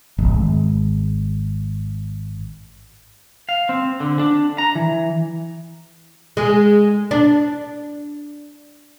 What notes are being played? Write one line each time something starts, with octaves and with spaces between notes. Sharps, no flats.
D1 G#1
F5
C4
D3
D4
A#5
E3
G#3
D4